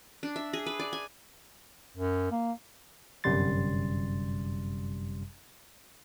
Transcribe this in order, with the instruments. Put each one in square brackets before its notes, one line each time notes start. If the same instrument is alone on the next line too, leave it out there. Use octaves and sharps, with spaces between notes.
[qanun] D4
E5
G#4
B4
D5
G#5
[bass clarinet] F#2
A#3
[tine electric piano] G1 F#2 C3 G3 C6 A6